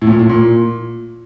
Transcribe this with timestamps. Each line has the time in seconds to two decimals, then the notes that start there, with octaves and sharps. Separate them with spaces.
0.02 A2
0.07 A#2
0.19 A2
0.29 A#2